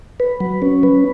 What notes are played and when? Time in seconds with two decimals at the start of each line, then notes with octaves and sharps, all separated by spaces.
0.20 B4
0.40 F#3
0.62 C#4
0.83 B4